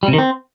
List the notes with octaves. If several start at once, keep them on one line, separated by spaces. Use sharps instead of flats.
G3
C3
D#3
C4